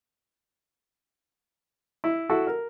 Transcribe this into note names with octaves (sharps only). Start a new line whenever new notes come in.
E4
E4 F#4 A4
A#4